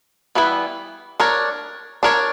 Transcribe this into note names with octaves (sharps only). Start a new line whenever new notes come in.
E3 G3 B3 E4 B4
D4 A#4 C#5
D4 A#4 C#5